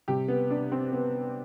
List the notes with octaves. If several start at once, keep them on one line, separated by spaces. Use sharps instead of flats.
C3 G3 G4
B3
D4
C4
B3